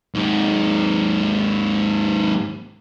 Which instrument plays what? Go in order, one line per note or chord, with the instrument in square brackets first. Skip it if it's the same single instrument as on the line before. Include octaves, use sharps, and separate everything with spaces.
[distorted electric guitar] D#2 G#2